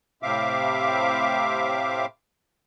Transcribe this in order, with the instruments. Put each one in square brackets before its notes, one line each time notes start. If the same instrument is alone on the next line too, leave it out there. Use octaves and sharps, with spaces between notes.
[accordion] A2 C3 C4 E5 F5 D6